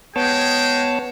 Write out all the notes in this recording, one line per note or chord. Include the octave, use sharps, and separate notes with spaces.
G#3 B3 G#4 C#5 G5 A5